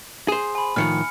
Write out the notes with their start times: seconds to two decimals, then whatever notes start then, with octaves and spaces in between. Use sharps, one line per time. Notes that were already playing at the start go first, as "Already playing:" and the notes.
0.28 G#4 C5
0.55 G#5 B5
0.76 A2 D#3 F3 F6 C#7